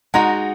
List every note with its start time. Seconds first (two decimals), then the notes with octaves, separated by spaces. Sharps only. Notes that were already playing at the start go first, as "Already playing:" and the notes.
0.14 G#3 D#4 F#4 F#5 A#5